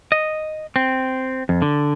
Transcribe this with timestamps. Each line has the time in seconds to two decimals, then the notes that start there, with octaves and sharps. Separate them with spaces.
0.12 D#5
0.76 C4
1.49 F2
1.62 D3